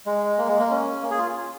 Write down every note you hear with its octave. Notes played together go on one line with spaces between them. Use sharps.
G#3
A#3
G#3
A#3
C#4
A#3
G#4
F4